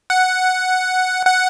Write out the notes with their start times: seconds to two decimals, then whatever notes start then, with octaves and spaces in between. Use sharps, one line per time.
0.10 F#5
1.26 F#5